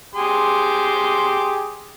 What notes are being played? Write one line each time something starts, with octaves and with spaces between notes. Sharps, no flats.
G4 G#4 C6